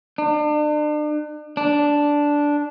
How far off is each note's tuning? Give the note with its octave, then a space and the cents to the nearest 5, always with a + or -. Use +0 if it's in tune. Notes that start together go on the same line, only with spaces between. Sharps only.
D4 +40
D4 -5